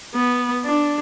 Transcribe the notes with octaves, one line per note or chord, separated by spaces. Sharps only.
B3
D4